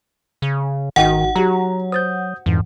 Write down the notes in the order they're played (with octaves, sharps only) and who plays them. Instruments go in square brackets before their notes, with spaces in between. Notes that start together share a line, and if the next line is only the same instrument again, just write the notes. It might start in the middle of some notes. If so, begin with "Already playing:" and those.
[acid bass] C#3
[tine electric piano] G#1 F#4 [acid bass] D#3 [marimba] D#4 D#5 G5 [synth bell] F#5
[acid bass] F#3 [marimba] F#4 G4 [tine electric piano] A#5
[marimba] C5 A6 [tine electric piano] D#6 G6
[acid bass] F2 [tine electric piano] G#2 E3